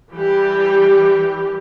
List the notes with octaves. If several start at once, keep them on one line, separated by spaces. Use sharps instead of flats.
E3 G3 G4